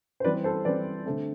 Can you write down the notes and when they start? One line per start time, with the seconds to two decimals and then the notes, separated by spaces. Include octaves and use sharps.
0.20 C5
0.24 E3 G3 C4 B4 D5
0.44 A4 C5
0.65 E3 G3 C4 B4 D5
1.05 D3 A3 C4